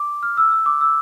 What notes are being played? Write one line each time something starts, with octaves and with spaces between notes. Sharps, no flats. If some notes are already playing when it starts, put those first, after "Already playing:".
Already playing: D6
F6
E6
E6
D6
E6